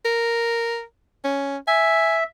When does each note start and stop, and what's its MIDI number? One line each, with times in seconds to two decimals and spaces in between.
0.05 0.82 70
1.25 1.57 61
1.68 2.24 76
1.68 2.16 80